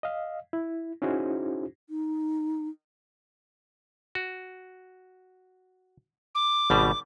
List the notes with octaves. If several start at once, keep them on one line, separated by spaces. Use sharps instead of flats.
D#5 F5
E4
C#4 D#4 E4 F#4 G#4 C5
D#4
F#4
D6
G#1 B2 G3